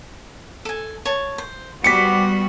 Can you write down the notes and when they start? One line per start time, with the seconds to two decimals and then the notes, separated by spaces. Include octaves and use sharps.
0.65 A4 G#5
1.05 C#5 A5
1.38 C5
1.84 G3 B3 F#4 G4 C5 B6 C#7